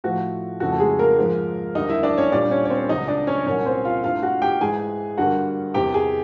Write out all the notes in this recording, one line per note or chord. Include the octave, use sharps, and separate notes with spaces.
A2 F3 A3 F#4
F2 C#3 E3 A3 F#4
A4
G#3 G#4
A#3 A#4
G#2 F3 G#3
D#2 D3 G3 A#3 D#4 D#5
E4 E5
D4 D5
C#4 C#5
A#2 G3 A#3 D4 D5
C#4 C#5
C#5
C4 C5
C#2 C#3 F#3 D#4 D#5
D4 D5
C#4 C#5
C2 A#2 F#3 A#3 C#4 C#5
C4 C5
F4 F5
G2 E3 A3 F4 F5
F#4 F#5
G4 G5
G#2 E3 G#3 G#4 G#5
G2 D3 G3 A#3 F#4 F#5
E2 C3 D#3 G4 G5
G#4 G#5